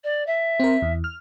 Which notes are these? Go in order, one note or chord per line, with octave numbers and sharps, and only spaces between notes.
D5
E5
C4 A#4
E2
F6